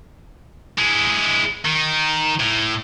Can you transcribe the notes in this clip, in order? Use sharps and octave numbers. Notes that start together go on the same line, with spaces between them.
G#3 E4
D#3
A2